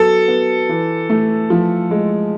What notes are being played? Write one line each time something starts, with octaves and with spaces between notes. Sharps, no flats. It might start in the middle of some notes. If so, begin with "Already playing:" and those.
Already playing: F#3 B3 A4
B3
E3
A3
F3
G#3